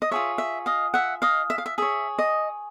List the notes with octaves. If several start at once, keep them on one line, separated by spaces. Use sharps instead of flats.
D#5
F4 G#4 C#5 E5
E5
D#5 F5
E5 F#5
D#5 F5
E5
F5
E5
G#4 C#5 E5
D#5